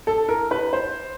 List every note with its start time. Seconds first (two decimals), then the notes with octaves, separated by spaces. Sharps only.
0.07 A4
0.28 A#4
0.51 B4
0.73 C5